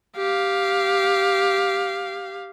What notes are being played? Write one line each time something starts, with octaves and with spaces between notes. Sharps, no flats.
G4 F5